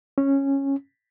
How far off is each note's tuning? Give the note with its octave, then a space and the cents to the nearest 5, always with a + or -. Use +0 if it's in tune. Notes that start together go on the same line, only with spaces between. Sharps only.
C#4 -10